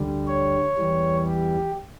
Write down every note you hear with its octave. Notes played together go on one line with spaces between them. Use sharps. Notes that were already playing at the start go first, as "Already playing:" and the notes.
Already playing: D2 D3 G3
C#5
E2 E3 G3
G4